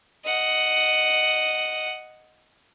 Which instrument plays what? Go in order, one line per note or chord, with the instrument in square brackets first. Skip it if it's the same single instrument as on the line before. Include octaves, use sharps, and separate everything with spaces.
[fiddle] D#5 F#5